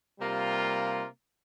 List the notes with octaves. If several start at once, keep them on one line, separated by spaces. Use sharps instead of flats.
C3 G3 A#3 F4